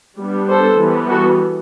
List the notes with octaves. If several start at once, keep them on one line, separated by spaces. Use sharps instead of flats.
G3 B3 D4
A4 C5
E3 G3 B3
F#4 A4